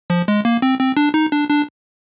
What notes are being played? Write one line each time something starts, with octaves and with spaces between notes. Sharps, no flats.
F3
G#3
A#3
C4
C4
D4
D#4
D4
D4